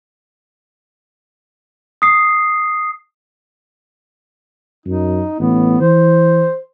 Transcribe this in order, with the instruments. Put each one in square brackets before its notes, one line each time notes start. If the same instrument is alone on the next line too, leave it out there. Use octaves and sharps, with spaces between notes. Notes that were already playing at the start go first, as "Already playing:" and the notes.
[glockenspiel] D#6 C7
[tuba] F#2 [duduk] D#4
[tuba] A1 [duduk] B3
[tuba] E3 [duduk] C5